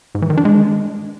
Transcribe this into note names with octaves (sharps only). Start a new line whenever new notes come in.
G#2
E3
D#3
D4
G#3